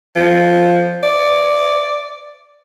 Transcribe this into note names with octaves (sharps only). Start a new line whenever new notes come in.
F3
D5